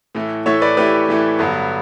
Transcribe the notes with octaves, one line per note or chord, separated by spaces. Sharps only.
A2 E3 A3
A2 E3 A3 C#5 E5
B4 D5
A2 E3 A3 G4 B4
A2 E3 A3
G2 D3 F#3 B3